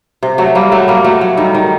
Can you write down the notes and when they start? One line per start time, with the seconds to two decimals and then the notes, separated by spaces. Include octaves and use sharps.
0.23 C3
0.38 F#3 A3
0.55 G3 A#3
0.72 F#3 A3
0.88 G3 A#3
1.04 F#3 A3
1.21 F#3
1.37 D#3 G3
1.55 D#3